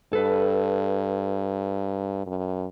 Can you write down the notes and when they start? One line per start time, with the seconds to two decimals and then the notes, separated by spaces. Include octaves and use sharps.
0.13 G2 A4 B4
2.26 F#2